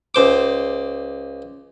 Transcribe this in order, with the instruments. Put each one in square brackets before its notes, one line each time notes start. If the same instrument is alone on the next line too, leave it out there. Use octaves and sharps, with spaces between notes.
[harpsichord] C#2 C5 D6